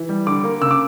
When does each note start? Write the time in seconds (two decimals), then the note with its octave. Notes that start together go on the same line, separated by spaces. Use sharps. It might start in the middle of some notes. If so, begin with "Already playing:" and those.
Already playing: E3
0.09 G3
0.27 D3 D6
0.44 A#3
0.61 C#3 E6
0.71 D6